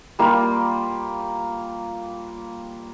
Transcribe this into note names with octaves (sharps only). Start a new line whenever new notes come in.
G3 A#3 F4